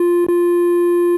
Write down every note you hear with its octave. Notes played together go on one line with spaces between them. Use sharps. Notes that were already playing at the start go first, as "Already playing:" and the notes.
Already playing: F4
F4